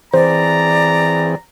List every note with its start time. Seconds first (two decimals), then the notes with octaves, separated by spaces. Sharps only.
0.14 E3 C4 G#4 C5 D5 A#5